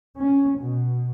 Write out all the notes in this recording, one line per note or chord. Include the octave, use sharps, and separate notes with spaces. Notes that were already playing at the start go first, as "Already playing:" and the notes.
C#4
B2